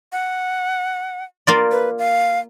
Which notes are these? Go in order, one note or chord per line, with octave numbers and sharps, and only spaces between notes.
F#5
A#3 F4 D5
B4
F5